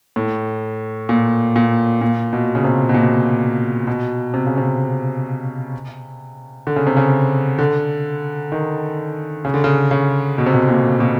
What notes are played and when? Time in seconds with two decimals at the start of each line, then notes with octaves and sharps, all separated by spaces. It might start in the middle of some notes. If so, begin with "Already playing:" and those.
0.16 A2
1.09 A#2
1.56 A#2
2.01 A#2
2.33 B2
2.55 C#3
2.64 C3
2.89 B2
2.94 A#2
3.87 B2
4.34 C3
4.47 C#3
4.58 C3
6.67 D3
6.76 C#3
6.87 C3
6.97 C#3
7.59 D3
8.52 D#3
9.45 C#3
9.54 D3
9.64 C#3
9.91 C#3
10.38 B2
10.46 C3
10.54 B2
10.69 A#2
11.00 B2